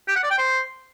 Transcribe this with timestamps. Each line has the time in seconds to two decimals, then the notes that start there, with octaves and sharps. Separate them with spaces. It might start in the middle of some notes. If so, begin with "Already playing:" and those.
0.08 G4
0.16 F#5
0.23 D5
0.31 G5
0.38 C5